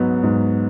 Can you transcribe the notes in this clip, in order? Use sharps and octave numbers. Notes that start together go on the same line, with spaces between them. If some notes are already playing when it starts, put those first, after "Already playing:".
Already playing: G#2 F#3 B3 D#4
G#2